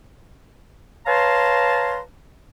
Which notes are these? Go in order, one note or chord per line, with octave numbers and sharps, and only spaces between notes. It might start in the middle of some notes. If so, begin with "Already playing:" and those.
B4 C#5 F5 A5 A#5 C6